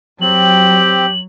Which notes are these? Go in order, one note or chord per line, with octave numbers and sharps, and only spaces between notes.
F#3 C4 G4 F#7